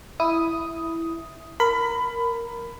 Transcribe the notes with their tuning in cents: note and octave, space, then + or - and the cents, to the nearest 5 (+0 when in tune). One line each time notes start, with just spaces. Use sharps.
E4 +0 D#6 +5
A#4 +0 B5 +20